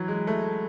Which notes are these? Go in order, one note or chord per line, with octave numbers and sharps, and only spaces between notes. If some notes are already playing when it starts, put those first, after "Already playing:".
Already playing: E3 F#3
G#3
A3